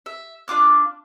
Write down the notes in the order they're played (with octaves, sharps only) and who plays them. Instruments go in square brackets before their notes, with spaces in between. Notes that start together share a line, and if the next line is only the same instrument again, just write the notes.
[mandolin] E5
D4 F4 D6 F#6